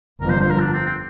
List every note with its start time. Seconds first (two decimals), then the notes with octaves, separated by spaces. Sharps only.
0.20 G1 F2 D3 F3 A#4
0.30 C5
0.41 C5
0.50 A#4
0.60 D4
0.72 C4
0.86 C4